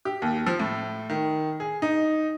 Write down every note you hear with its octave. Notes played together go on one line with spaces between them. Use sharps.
G4
D#2
F3
A2
D#3
G#4
D#4